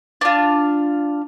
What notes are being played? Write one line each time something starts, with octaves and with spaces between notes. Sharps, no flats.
D4 F4